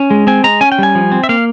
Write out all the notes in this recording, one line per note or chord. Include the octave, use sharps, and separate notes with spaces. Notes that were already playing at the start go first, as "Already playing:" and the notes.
Already playing: C#4
G#3
C4 G#5
G#3 A#5
C#4 G#5
G5
G3 G#5
F3
C4
E5
A#3 F5